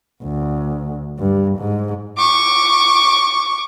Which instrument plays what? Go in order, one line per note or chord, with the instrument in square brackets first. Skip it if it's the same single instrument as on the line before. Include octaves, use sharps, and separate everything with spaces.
[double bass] D2
G2
G#2
[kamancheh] C#6 D6